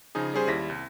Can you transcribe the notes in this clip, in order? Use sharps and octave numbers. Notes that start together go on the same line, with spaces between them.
C#3 F3 D#4 G#4
G3 C#4 G#4 C5
D#2 G3 E4 A#6 B6
C2